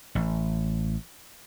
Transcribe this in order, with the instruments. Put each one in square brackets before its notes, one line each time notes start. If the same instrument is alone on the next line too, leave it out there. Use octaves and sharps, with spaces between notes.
[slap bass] A1